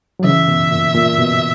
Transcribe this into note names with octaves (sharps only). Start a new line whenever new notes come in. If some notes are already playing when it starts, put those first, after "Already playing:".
F#3
C#3 E3 E5
B2
A#2
A#2
B2